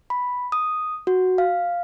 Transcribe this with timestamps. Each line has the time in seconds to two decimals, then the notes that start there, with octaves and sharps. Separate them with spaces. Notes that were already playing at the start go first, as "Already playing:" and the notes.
0.10 B5
0.52 D#6
1.07 F#4
1.38 F5